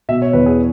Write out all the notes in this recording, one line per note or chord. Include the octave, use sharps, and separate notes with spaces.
B2 E5
C#5
E2 B4
G#4